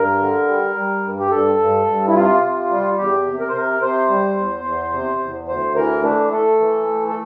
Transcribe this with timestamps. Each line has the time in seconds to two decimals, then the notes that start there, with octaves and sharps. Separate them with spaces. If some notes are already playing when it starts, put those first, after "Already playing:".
Already playing: G2 A#4
0.20 D3
0.48 G3
0.75 G3
1.04 G2
1.19 G4
1.31 G2 A4
1.59 G2
1.87 G2
2.08 E4
2.14 C3 F4
2.42 C3
2.70 G3
2.98 E2 G4
3.26 C3
3.40 A#4
3.49 C5
3.54 C3 A#4
3.81 C3 C5
4.09 G3
4.37 E2
4.64 E2
4.93 C3
5.20 E2
5.48 D2 C5
5.76 E3 A#4
6.04 A3 D4
6.31 A3 A4
6.60 E3
6.87 A3
7.08 A4